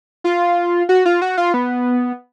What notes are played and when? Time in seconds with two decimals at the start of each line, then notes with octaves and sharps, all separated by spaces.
0.24 F4
0.89 F#4
1.05 F4
1.22 F#4
1.37 F4
1.54 B3